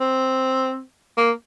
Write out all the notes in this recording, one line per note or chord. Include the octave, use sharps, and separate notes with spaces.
C4
A#3